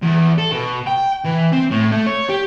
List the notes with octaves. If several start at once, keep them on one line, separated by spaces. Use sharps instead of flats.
E2
A4
B2
G5
E3
C4
A2
A3
C#5
G4